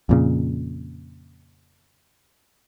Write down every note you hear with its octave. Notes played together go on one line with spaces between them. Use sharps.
F2 A#2 C#3